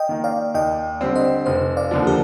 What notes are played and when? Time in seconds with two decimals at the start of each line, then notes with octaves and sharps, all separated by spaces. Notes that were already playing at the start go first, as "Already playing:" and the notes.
Already playing: D#5 G5
0.09 D#3 A#3
0.24 D5 F5
0.54 D#2 D#5 G5
1.01 D3 G3 C4
1.15 C5 D#5
1.46 F1 C5 D#5
1.77 D5 F5
1.91 D#2 D3 F3
2.07 G4 A#4